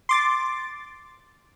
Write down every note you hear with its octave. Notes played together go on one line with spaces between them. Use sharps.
C6 D6 A6